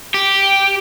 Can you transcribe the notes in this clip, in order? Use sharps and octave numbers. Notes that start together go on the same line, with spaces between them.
G4